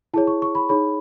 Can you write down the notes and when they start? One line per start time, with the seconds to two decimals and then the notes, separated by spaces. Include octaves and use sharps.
0.14 E4 G#4 C#5 A5
0.27 C#6
0.42 C#6
0.55 B5
0.69 D#4 G#4 C#5 B5